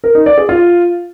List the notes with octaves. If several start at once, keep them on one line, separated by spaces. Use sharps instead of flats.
A#4
D#4
D5
G#4
F4